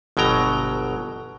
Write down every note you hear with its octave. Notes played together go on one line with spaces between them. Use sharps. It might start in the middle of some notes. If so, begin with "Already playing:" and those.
G1 B2 F#3 G5 A#5